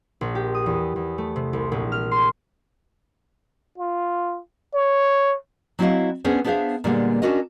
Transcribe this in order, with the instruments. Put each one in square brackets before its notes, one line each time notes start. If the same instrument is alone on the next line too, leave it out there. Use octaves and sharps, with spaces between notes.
[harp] A#1
G4
D#6
E2
E2
A3
C3
C2
A#1
F6
C6
[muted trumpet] F4
C#5
[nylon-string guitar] F#3 C4 E4 F#4 D#5 F5
B3 C#4 D4 G#4 C5
B3 D4 G#4 C5 E5 F5
A#2 D3 G3 G#3 A#3 B3
C#4 D4 F#4 A#4 D#5